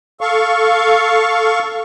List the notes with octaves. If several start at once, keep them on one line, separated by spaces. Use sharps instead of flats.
A4 F5 C#6